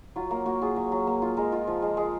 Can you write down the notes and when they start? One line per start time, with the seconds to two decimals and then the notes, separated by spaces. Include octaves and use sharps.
0.16 F#3 F4
0.31 A#3
0.46 A#3 F#4
0.62 F4 G#4
0.76 F#3
0.92 F#3
1.07 A#3
1.22 F4
1.37 G#3 A#4
1.52 F4
1.67 F3
1.82 G#3
1.97 G#3 G#4